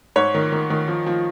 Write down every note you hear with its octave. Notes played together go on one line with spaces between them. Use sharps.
G#2 C#5
D#3
D#3
D#3
F3
F3